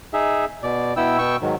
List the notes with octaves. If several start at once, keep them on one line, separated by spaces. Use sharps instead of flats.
D#4 G#4 E5
B2 D5
B2 B3 E4 G5 E6
B2 B3 G5 C#6 E6
G#2 D#3 F#3